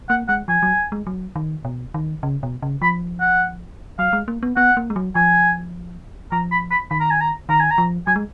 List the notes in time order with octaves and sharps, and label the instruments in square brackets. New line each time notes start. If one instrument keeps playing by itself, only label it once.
[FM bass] A#3 [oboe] F#5
[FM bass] G#3 [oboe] F#5
[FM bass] F3 [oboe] G#5
[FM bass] F#3
G#3
F#3
D#3
B2
D#3
C#3
B2
C#3
[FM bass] F3 [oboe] B5
[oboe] F#5
[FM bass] F#3 [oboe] F5
[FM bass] G#3
A#3
B3
[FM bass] B3 [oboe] F#5
[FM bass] A#3
G#3
F#3
[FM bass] F3 [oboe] G#5
[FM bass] F3 [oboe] A#5
[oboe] B5
B5
[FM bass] D#3 [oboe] B5
[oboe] A#5
G#5
A#5
[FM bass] D#3 [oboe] A#5
[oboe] G#5
A#5
[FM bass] F3
[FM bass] F#3 [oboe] G#5
[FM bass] G#3